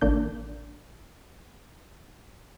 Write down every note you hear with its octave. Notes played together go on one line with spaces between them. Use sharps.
A1 A#3 D4 G6